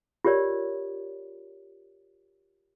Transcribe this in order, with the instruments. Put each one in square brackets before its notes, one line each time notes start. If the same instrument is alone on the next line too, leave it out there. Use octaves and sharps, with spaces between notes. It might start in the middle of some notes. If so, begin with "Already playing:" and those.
[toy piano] F4 G4 A#4 C#5 D5